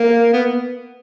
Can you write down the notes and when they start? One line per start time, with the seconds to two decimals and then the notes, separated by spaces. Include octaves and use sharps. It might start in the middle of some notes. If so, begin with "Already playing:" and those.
Already playing: A#3
0.34 B3